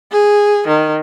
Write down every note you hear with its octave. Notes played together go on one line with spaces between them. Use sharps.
G#4
D#3